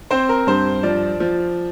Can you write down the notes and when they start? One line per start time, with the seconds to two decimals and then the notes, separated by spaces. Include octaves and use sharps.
0.10 C4 C5
0.29 A#4
0.47 G2 C5
0.83 F3 D5
1.20 F3